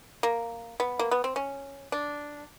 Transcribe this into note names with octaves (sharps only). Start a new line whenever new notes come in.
A#3
B3
A#3
B3
C4
C#4
D4